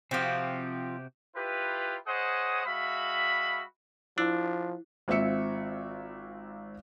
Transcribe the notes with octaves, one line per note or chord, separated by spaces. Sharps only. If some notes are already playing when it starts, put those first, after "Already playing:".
C3 F3 C4 F#4 G4
E4 F4 G4 B4
G#4 C5 C#5 D#5 F#5 D#6
G#3 F#4 E5 F5 B5
F3 D4 E4
G#1 C4 F4 E5 C#7